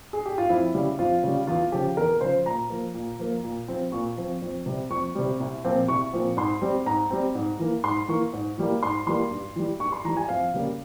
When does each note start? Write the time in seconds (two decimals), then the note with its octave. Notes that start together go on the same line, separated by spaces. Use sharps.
0.13 G#4
0.26 G4
0.38 F4
0.49 F2 E4
0.74 C#3 G3
0.99 F2 F4
1.23 C#3 G3
1.47 E2 F4
1.72 C#3 F3 G4
1.97 E2 A#4
2.21 C#3 F3 C5
2.46 A#2 A#5
2.70 F3 A#3
2.94 A#2
3.19 F3 A#3
3.44 A#2
3.68 F3 C4
3.92 A#2 C#6
4.17 F3 C4
4.42 F2
4.66 C3 G3
4.90 F2 C#6
5.15 C3 G3
5.40 C2
5.64 A#2 F3 C4
5.88 C2 C#6
6.13 A#2 F3 C4
6.37 G#2 C6
6.62 G3 C4
6.86 G#2 A#5
7.10 G3 C4
7.35 G#2
7.59 E3 A#3
7.84 G#2 C6
8.08 E3 A#3 C#6
8.33 G#2
8.58 E3 G3 A#3
8.83 G#2 C6
9.06 E3 G3 A#3 C6
9.31 G2
9.56 E3 G3
9.80 G2 C#6
9.92 C6
10.04 E3 G3 A#5
10.17 G#5
10.28 F2 F5
10.54 C#3 G3 A#3